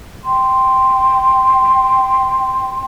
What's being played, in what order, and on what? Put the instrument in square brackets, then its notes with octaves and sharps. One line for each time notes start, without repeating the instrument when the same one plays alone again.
[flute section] G5 C6